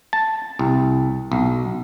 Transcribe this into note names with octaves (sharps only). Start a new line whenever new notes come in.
A5
C2
B1